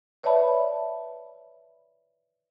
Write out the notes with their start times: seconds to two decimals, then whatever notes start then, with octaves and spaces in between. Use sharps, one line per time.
0.23 B4 C#5 D5 E5 A5 B5